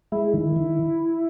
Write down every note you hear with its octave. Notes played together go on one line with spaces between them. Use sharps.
G#3 E4
D#3
D#3